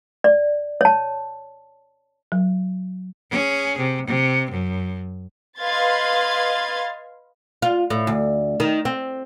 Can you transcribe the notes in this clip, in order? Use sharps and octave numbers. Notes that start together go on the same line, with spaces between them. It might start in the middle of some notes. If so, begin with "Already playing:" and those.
D5
C#5 A5
F#3
C#4 G#4
C3
C3
F#2
B4 D#5 F5 C6 G#6 A6
F4
A2
D2
D#3
C4